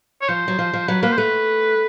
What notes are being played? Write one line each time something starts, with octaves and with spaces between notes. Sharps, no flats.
C#5
F3 C5
F#3
F3
F3
F#3 B4
A#3 B4
C5
A3 B4